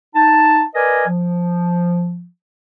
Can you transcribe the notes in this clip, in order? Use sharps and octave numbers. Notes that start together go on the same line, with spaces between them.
D#4 A5
A#4 B4 D5 D#5 G#5
F3